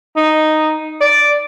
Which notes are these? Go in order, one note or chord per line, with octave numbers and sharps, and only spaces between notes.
D#4
D5